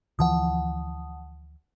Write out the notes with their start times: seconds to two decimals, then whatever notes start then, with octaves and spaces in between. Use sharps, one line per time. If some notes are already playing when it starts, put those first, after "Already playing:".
0.19 D2 E3 F3 F#5 A5 D#6